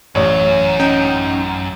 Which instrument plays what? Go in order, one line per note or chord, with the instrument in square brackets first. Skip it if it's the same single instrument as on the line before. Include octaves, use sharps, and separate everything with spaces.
[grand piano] A1 C#5 [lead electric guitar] F#2
[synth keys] C#4 D#4 G5